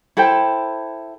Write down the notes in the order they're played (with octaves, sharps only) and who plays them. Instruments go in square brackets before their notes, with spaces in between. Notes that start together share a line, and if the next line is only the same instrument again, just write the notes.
[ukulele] E4 A4 C5 G5